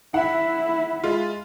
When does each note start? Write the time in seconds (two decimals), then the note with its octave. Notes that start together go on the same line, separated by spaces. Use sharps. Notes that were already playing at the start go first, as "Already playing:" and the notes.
0.14 E4 E5 F#5
1.04 G#3 F4